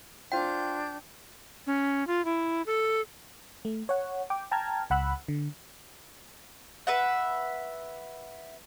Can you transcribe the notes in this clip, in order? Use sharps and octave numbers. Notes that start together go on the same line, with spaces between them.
D4 F4 C5 G5 G6
C#4
F4
E4
A4
A3
C#5 F#5
G5 D6
G5 A5 A#5 F6 G#6
C#2 F#5 B5 E6 F#6
D3
B4 E5 F#5